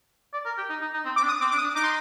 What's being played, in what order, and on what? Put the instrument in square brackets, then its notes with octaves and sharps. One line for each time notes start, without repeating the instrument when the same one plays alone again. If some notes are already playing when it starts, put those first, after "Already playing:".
[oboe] D5
A#4
G4
D#4
D#4
D#4
C4
[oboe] C4 [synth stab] D6
[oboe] D4
[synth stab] D#6
[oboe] C4 [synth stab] D6
[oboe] D4 [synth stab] D6
[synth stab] D#6
[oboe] D4
[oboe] D#4 [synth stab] D6
[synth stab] C6